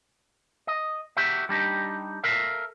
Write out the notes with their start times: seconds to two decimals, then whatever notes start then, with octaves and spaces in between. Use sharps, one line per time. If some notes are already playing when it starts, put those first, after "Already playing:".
0.67 D#5
1.17 F#4 G4 E5
1.49 G3 D4 D#4 G4
2.24 A4 A#4 E5 F5